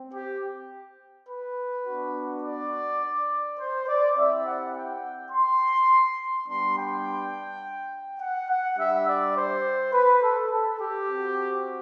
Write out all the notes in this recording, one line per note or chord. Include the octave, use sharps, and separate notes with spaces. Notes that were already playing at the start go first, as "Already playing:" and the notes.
Already playing: C4
G4
B4
B3 D4 F#4
D5
C5
D5
C4 E4 G4 E5
F#5
G5
C6
G3 B3 D4 C6
G5
F#5
F#5
G3 D4 G4 E5
D5
C5
B4
A4
A4
G4
C4
F#4